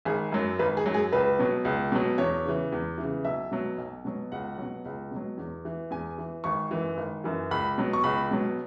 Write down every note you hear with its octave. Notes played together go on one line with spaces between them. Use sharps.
G#1 G#4
F#2 F#3
G#1 B4
G#4
F#2 F#3
G#4
C#2 B4
B2 F#3
C#2
B2 F#3
E2 C#5
C#3 E3
E2
C#3 E3
B1 E5
B2 F#3
B1
B2 F#3
C#2 F#5
B2 F#3
C#2
B2 F#3
E2
E3
E2 G#5
E3
G#1 C#6
F#2 E3
G#1
F#2 E3
C#2 B5
B2 F#3
C#6
C#2 B5
B2 F#3